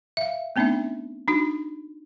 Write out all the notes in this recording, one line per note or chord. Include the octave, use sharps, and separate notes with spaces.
E5 F5
A3 B3 C4 D4 D#4 E5
D4 D#4 F#4